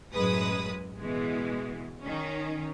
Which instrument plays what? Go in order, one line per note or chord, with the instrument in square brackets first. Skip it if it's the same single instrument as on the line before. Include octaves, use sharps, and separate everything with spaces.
[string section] A1 F#2 G#3 B4 D#6
B2 E3 G#3
D#3 C#4